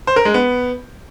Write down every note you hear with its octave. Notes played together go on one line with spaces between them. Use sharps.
C5
A#4
G#3
B3